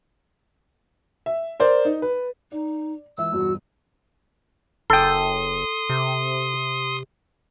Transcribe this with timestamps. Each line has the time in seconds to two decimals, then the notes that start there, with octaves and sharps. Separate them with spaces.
1.26 E5
1.60 A#4 C5 D5
1.85 D#4
2.02 B4
2.52 D#4 D5
3.18 C#2 E3 E5 E6
3.33 G1 E2 B2 F#4
4.90 F#1 A4 G5 C6 D#6
5.89 C3